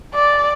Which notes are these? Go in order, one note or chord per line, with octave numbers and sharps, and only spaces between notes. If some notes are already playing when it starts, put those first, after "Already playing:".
D5